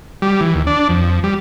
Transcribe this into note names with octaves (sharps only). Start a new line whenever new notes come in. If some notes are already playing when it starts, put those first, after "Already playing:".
G3
E3
D#2
D4
F2
G3